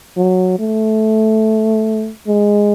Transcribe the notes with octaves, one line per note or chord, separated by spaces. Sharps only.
F#3
A3
G#3